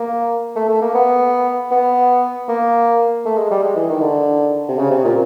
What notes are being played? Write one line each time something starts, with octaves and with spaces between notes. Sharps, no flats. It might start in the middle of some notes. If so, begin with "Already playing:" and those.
Already playing: A#3
A3
A3
A#3
B3
B3
A#3
A3
G#3
G3
G#3
E3
D#3
D3
C3
C#3
C3
A#2